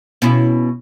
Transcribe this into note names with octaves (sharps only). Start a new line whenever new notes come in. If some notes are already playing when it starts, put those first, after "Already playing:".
B2 C#4 E4